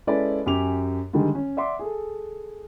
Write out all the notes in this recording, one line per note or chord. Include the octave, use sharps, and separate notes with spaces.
G#3 C#4 E4 A4 B4 D5
F#2 G4 G#5 D6 F7
D3 D#3 G3 G#3
C#4
D5 E5 F#5 C6 D6
G#4 A4